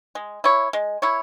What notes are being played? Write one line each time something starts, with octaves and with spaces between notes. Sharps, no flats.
G#3
E4 C#5
G#3
E4 C#5